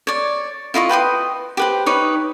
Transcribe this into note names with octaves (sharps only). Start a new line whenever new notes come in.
C#5 D5
E4 F4 D#5 C#6
B4 G5 C6 D#6
G4 B4 C5
D#4 B4 C#5 D6